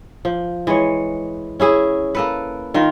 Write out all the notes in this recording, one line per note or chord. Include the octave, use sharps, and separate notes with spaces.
F3
E3 G#3 C#5
C#4 E4 G#4
A#3 A4 B4
D#3 F4 A#4